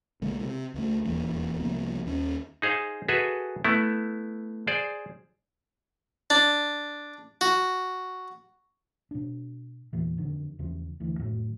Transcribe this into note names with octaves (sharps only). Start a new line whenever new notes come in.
B1 C#3 G#3 A#3
C3
C#2 A3
D#1 E2 A#3
C2 F3 A#3 B3
D#2 C#4
D#4 G#4 C5 F5
F#4 G#4 A4 B4 E5 G#5
A3 B3 E4
G#4 C5 D5
D4
F#4
B2 D4
E2 A#2 E3
F2 D3 D#3
E2 C#3 F3
D2 E3
F2 A2 D#3 F#3